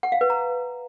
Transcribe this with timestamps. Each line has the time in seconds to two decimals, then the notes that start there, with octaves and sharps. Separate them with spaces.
0.03 F#5
0.12 F5
0.21 B4
0.30 A#5